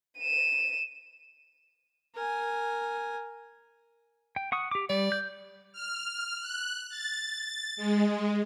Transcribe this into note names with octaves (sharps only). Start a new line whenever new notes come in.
D#7 E7
A#4 G#5
G5
F#5 C#6 D#6
G4 D6
G3 D5
G6
F6
F#6
A6
G#3